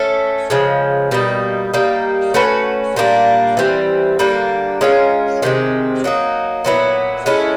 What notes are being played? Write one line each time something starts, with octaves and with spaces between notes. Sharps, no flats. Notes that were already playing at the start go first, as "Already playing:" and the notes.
Already playing: A3 C#4 A4
C#3 F3 G#3
B2 G3 A#3 D#4
G3 A#3 D#4
A3 C#4 F#4 B4
A#2 G3 A#3 D4
E3 G3 C4
D3 G3 A#3 D4
G#3 C#4 F4 A#4
C3 D#3 G#3 C4
F#3 A#3 D#4
A#2 F#3 B3 E4
G#3 C#4 E4 A4